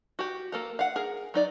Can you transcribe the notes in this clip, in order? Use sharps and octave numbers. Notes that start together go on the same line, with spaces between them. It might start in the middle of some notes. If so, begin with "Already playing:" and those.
F#4 G4
A#3 A4 A#4
F5 F#5
G#4 A#4
F#3 D#4 D5